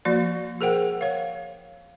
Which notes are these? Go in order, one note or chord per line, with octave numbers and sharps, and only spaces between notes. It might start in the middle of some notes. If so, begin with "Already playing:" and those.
F3 A#3 F#4 D5
G#4 A#4 C5 F#5 G5
C#5 F5